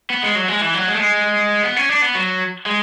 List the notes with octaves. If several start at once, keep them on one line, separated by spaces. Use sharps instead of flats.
B3
G#3
F#3
G#3
E3
F#3
G#3
A3
G#3
B3
C#4
D4
B3
F#3
G#3